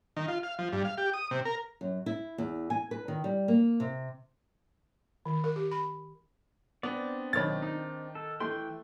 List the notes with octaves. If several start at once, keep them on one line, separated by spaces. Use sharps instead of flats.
D#3
F4
F5
F3
G2
F5
G4
D#6
C3
A#4
F#2
E4
E2
G#5
B4
D#3
G3
A#3
C3
D#3
A#4
G4
B5
B3 C4 D4 D5
B1 D#3 C#5 B5 A6
D#4
A4
E3 A3 G5 C6